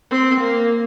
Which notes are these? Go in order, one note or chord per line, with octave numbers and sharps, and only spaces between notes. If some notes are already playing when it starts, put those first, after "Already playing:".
C4
A#3